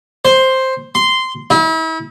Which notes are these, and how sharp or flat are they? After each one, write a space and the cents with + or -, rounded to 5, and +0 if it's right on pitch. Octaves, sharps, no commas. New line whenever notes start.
C5 +5
C6 -10
E4 -40